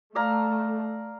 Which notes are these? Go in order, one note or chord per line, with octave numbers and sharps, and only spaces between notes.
A3 D5 F5 A#5